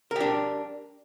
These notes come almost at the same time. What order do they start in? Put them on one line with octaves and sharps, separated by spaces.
A#4 G4 D4